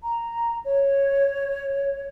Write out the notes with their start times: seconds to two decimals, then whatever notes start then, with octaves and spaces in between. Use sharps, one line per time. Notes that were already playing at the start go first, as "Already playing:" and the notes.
0.02 A#5
0.63 C#5